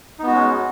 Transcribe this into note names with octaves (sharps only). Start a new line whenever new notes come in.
G#3 B3 C#4 D#4 F#4